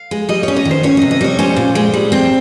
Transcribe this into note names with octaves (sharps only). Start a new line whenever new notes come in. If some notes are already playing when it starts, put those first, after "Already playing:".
Already playing: F5
G#3
G3 D#5
C#4 C#5
D#5
D#3
C5
C#4 C#5
C3 D#5
D#5
G3 C#5
C#4 C5
A#2
G#3
G3
C4